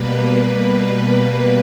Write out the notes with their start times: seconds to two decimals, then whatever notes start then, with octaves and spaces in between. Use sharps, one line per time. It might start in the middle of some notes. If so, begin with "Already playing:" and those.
Already playing: B2 G3 A#3 B4